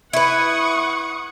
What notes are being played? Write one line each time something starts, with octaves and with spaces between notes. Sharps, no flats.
E4 B4 F#5 C#6 D#6